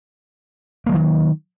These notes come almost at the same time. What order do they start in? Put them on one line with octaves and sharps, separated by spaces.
A#3 E3 F#3 D#3